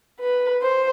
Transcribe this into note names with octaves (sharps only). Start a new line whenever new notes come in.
B4
C5